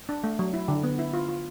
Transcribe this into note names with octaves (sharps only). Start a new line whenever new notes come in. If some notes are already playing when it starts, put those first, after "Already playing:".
D4
A3
F#3
E4
D3
B3
E4
F4
F4